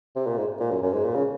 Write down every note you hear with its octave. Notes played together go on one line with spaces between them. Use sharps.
C3
A#2
G#2
A#2
F#2
F#2
G#2
A#2
C#3